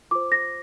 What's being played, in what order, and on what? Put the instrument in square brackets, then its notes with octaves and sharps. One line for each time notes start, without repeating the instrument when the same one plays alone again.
[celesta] F4 C5 D6
A#6